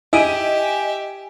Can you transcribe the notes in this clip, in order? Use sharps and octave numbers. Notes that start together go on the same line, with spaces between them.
E4 G4 D#5 E5 G#5 D7 D#7